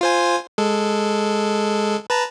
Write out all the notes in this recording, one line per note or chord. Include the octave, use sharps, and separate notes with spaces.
F4 C5 G#5
G#3 A4
B4 A5 A#5